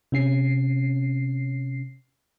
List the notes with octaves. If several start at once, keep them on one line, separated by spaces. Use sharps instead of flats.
C3 C#4 C7